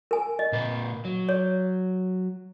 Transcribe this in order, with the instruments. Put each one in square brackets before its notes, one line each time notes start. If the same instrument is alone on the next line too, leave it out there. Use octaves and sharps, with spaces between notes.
[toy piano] A#4 G#5
D#5
[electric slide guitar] A#2 A#4 B4
F#3
[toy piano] C#5